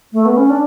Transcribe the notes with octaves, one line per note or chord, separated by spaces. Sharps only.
A3
B3
C#4
D4